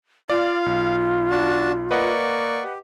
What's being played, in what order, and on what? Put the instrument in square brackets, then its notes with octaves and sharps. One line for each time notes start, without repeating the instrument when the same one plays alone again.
[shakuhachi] F4 [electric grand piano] D5 [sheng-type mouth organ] F5
[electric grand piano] B1
[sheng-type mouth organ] D4 F#4 A5
[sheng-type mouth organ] A#3 D5 C#6 [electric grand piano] B4 D#5 F#5
[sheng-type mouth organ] G4